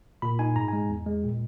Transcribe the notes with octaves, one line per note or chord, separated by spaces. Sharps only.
A#2 B5
D#4 G#5
G#2 A#5
G#3 G#5
E2
G#3
A#2